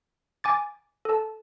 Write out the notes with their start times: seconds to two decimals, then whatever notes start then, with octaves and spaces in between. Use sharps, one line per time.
0.44 G#5 D6 A6
1.05 A4 A5